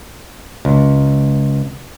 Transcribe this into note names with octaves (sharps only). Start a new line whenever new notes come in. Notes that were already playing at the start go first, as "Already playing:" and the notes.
C#2